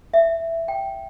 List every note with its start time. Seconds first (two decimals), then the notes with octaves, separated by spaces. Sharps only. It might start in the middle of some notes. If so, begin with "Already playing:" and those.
0.14 E5
0.68 G5